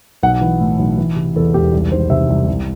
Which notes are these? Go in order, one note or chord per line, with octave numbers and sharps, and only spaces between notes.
B1 F#5
E3
A2
B1
E3
C3
E2 A4
E1 G4
C2
D#3 C5
C3 E5
C2
C2